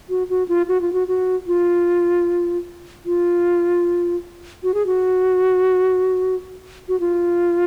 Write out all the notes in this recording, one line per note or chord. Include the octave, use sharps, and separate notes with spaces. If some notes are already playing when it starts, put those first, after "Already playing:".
F#4
F#4
F4
F#4
F4
F#4
F#4
F4
F4
F#4
G#4
F#4
F#4
F4